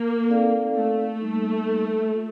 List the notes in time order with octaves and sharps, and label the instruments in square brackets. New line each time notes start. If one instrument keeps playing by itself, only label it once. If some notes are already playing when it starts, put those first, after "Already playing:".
Already playing: [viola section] A#3
[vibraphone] C4 D#4 A4 D5 F5
[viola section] A3
[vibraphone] G3 A#3 D#4
A#3 F4 A4